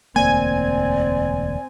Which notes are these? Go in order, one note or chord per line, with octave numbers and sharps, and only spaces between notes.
E1 D2 A#3 C4 D5 G#5